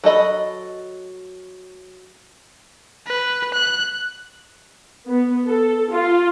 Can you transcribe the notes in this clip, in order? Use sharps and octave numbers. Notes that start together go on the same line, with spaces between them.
F#3 A4 D#5 B5
B4
F#6
B3
A4
F4